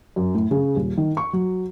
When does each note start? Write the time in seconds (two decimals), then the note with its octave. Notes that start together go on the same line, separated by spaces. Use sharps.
0.16 F#2
0.35 A2
0.51 C#3
0.75 D#1
0.97 D#3
1.17 C#6
1.33 F#3